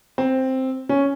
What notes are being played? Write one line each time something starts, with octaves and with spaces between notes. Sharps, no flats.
C4
C#4